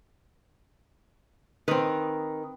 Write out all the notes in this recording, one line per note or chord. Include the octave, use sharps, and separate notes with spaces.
D#3 C4 B4